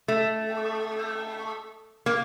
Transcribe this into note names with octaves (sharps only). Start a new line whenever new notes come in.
A3
A#3